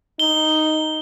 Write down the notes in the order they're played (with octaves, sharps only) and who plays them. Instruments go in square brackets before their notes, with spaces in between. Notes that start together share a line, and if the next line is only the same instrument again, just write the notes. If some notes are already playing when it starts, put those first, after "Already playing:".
[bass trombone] D#4 [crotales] G7